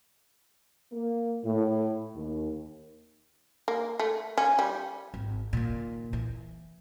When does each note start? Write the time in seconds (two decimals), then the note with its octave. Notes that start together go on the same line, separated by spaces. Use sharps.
0.92 A#3
1.44 A2
2.15 D#2
3.68 A#3
4.00 A3
4.38 C#4
4.59 G3
5.14 G#1
5.53 A#2 D#3
6.13 E3